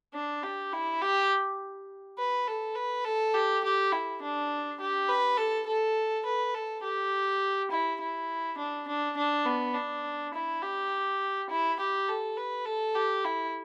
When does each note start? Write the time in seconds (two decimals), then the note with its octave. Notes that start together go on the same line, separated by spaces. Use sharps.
0.14 D4
0.43 G4
0.73 E4
1.02 G4
2.18 B4
2.48 A4
2.76 B4
3.05 A4
3.34 G4
3.64 G4
3.92 E4
4.22 D4
4.80 G4
5.09 B4
5.38 A4
5.67 A4
6.25 B4
6.55 A4
6.83 G4
7.71 E4
8.01 E4
8.58 D4
8.88 D4
9.17 D4
9.46 B3
9.75 D4
10.34 E4
10.63 G4
11.50 E4
11.80 G4
12.09 A4
12.37 B4
12.66 A4
12.95 G4
13.24 E4